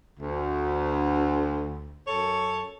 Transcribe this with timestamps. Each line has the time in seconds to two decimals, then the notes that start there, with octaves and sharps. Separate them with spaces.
0.20 D2
2.08 F#2 A4 C#5